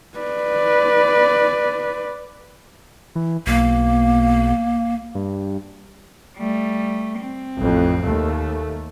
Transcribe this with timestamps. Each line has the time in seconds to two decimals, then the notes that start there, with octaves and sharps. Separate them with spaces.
0.18 B4 D5
3.15 E3
3.47 B1 A#3
5.15 G2
6.37 G3 A3
7.19 C4
7.57 A1 F2
8.01 D#2 A3